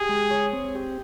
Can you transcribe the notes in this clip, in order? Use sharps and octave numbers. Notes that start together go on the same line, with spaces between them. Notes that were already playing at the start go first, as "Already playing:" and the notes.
Already playing: G4 G#4
G#3
C#5
C4
G4